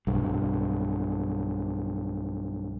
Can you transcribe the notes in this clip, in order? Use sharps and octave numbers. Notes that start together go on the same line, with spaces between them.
B1 G2